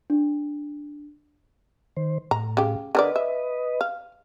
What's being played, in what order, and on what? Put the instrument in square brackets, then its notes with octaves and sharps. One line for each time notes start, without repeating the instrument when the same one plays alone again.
[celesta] D4
[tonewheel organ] D#3 C5
[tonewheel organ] A2 [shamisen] A#5
[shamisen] C#3 G4
[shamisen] D3 A#4 D5 [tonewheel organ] B4 D#5
[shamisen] E5
F5